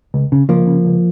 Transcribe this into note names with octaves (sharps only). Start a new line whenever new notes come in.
C#2
C#3
C#2 F3 A#3
C#3
C#2